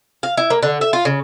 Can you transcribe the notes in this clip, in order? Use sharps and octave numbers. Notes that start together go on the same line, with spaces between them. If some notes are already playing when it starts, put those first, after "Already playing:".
F5
E4
A#3
D3
E5
F4
C#3